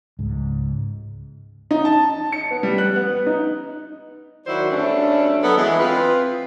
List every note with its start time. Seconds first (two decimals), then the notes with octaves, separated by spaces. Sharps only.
0.19 C#2 G#2
1.71 D#4
1.85 A5
2.32 C#7
2.51 B3
2.63 G3
2.78 F#6
2.96 B3
3.26 D#4
4.46 D#3 F#3 E4 F#4 C5 D5
4.70 D2 G2 A3 C#4 D4
5.41 F#3 B3 A4
5.56 E3 G#3
5.79 C4 F4 B4